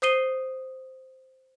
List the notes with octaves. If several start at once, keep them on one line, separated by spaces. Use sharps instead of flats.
C5 D#6 C7 D#7 G7